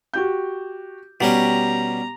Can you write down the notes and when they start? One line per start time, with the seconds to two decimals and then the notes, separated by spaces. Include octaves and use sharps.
0.14 F#4 G4 G6
1.21 B2 G3 C#4 G4 A#5